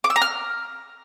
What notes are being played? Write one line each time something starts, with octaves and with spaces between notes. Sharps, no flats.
D6
E6
A#5
F6